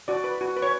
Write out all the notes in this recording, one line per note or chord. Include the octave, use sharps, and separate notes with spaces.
F#4 D5
B4
F#4
B4
C#5